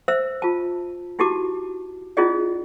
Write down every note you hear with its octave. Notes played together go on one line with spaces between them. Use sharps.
C5 E5 E6
F4 A5
D#4 E4 F#4 G4 A5 D6
C#4 E4 F4 G#4 D5 D#5